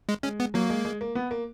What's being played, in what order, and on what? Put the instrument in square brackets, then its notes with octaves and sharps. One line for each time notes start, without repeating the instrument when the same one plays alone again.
[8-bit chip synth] G#3
[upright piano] G#3 [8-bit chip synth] C#4
[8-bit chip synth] B3
[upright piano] F#3 [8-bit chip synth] A#3
[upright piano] G#3
G#3
A#3
B3
A#3